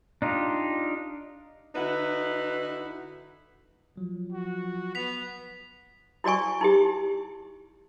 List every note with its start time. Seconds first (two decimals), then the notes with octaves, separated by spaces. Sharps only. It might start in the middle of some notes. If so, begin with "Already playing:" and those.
0.22 D4 D#4 F4 G4
1.75 D3 D#4 E4 F#4 B4
3.97 F3 F#3
4.32 F#4
4.95 B3 B6 F7
6.24 E4 F#4 D5 G#5 C#6
6.61 D#4 E4 G4